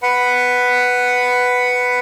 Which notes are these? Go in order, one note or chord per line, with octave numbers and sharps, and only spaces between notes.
B4 F#5 B5